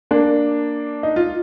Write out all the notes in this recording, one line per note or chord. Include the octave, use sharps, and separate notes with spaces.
A#3 D4
D#4
F4